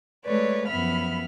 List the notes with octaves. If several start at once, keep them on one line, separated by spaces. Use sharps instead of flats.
G#3 A3 B4 C#5 D5
F#2 F3 B3 E5 B5 F6